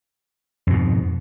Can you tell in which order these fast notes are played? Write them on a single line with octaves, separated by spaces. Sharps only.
F2 B2 G#2